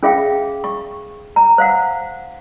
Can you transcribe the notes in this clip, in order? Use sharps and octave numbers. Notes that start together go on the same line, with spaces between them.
C#4 G#4 E5 F5 G5
C#6
A#5
C5 F5 F#5